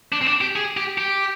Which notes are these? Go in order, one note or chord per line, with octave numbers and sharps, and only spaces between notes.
D4
C4
D4
G4
G#4
G4
G4